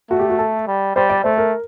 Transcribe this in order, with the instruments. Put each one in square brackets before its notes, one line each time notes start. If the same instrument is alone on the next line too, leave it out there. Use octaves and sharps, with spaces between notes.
[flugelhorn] A3 [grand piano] F#4
[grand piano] G4
F#4
A4
[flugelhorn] G3
[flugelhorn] G3 [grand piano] C5
[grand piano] D5
[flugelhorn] A3 [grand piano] C5
[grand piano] A#4